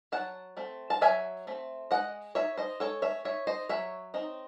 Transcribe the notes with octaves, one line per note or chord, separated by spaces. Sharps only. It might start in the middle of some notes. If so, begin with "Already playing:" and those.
F#3 F#5 A5
A3 C4
A5
F#3 E5 G#5
A3 C4
G#3 D#5 F#5
D#4 C#5 E5
C5 D#5
G#3 A4 C#5
C#5 E5
D#4 C#5 E5
C5 D#5
F#3 C#5 E5
C4 D#4